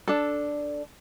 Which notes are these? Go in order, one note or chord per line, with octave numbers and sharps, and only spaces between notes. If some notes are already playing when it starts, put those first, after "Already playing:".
D4 A4